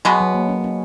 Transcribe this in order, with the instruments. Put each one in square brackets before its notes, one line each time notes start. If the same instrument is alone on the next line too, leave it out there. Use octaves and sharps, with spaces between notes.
[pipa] B2 G#3 B3 [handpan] F#3
[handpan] F#3
A#3
C#4
C#4